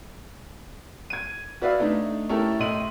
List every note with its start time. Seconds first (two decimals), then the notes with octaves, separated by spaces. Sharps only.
1.10 G#6 D#7
1.62 F#4 B4 D5 E5 F5
1.80 A3 D4 D#4
2.29 A3 C#4 E4 G4 A4 A#4
2.59 A2 D#5 E5 C6 D#7 F#7